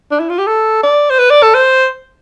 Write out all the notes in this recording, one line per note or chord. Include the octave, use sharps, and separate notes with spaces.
D4
E4
F4
G4
A4
D5
C5
B4
D5
A4
C5